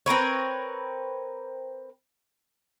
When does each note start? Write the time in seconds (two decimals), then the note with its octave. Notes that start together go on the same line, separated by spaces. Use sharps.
0.06 C4 A#4 B4 C#5